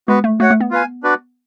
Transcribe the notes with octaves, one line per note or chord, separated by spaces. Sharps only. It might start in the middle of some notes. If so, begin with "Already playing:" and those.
G#3 B3 F#4 B4
A3
A3 F#4 C#5 F#5
A3
B3
F4 B4 F5 G#5
D4 F#4 B4 D5